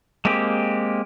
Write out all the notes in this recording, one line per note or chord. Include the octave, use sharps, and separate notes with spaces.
G#3 A#3 C4 G4